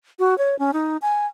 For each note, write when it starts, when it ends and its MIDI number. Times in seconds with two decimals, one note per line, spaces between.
0.19 0.37 66
0.38 0.58 73
0.59 0.71 61
0.73 0.97 63
1.02 1.26 80